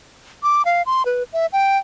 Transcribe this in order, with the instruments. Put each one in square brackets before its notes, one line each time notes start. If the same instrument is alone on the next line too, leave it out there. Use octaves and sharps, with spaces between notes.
[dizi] D6
F5
C6
B4
E5
G5